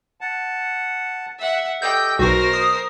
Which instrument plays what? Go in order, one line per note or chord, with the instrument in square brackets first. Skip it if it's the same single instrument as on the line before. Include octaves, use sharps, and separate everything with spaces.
[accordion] F#5 A5
[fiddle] E5 F#5
[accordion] G4 A4 D#5 [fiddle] G5 [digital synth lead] G6
[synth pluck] B1 [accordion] B2 [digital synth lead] F#4 [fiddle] A#4 C5
[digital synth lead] D#6